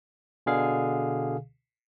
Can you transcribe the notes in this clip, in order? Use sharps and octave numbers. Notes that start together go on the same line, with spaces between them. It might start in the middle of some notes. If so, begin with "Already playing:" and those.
B2 D3 G#4 F5